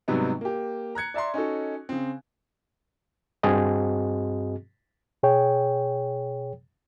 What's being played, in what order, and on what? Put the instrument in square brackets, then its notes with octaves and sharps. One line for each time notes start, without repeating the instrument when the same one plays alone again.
[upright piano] G#2 C3 F#3 G3 B3 D#4
A#3 G4
A#5 F#6 G#6 C#7
D5 E5 A#5 C6
C#4 D#4 F#4 A4
C#3 C4
[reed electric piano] G2 C4 F#4 G#4 D#5
B2 G#4 C#5 G5